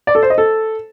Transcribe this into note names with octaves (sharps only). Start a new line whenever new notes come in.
D5
A4
C5
D#5
A4